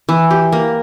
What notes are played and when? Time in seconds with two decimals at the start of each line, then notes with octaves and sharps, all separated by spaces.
0.09 E3
0.31 G4
0.52 A#3